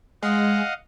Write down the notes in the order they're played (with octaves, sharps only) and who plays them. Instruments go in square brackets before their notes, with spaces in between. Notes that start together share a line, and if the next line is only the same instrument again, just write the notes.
[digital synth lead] G#3 [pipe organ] D#5 F5 F#5